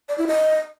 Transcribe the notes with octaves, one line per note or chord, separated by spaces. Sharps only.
D5
E4
D#5